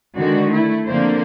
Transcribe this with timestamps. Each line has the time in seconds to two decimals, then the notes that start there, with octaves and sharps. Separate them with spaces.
0.17 D3 D#3 G#3 F#4
0.50 A3 E4
0.88 D3 F3 A#3 C4 C5